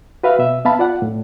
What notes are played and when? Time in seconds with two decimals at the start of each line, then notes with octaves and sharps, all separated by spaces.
0.23 F#4 B4 E5 F5
0.39 B2 E5
0.65 B3 E5 F5 A5 B5
0.79 F4 D5 F#5
1.02 A2